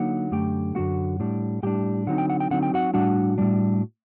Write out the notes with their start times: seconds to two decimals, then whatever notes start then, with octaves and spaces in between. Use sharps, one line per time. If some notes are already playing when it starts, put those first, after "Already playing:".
Already playing: D3 F#3 A#3 D#4 F#5
0.31 F#2 D3 A3 G4 G5
0.75 F#2 D3 A3 F#4 F#5
1.20 A2 G3 D4
1.63 A2 G3 D4 G4 G5
2.07 D3 F#3 C4 D#4 F#5
2.18 G5
2.30 F#5
2.40 G5
2.51 D3 F#3 C4 D#4 F#5
2.63 G5
2.74 F#4 F#5
2.94 A2 G3 D4 F#4 F#5
3.38 A2 G3 D4